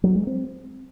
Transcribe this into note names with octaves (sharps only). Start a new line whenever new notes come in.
F#3
G#3
C4